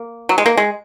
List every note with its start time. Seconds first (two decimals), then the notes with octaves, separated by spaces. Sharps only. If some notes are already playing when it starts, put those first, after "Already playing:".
Already playing: A#3
0.29 F#3
0.38 G#3
0.46 A#3
0.57 G#3